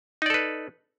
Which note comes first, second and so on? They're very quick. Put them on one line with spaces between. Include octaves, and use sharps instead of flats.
D#4 D5 A4 B4